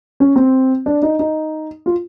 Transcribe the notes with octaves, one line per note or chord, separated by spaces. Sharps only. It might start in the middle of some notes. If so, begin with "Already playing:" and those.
C#4
C4
D4
D#4
D#4
F4